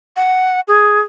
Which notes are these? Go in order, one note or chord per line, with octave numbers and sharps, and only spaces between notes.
F#5
G#4